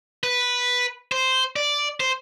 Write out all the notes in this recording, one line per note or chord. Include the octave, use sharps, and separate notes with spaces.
B4
C5
D5
C5